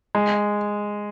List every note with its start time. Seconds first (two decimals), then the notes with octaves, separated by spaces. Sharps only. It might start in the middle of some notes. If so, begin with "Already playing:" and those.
0.15 G#3